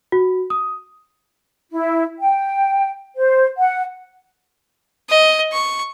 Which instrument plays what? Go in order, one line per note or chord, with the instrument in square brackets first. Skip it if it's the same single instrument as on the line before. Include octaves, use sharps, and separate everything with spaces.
[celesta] F#4
D#6
[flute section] E4
G5
C5
F#5
[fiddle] D#5
C#6